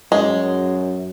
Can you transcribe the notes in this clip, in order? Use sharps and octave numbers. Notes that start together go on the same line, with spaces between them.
F#2 G#3